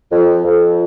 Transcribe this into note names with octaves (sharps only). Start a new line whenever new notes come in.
F2
F2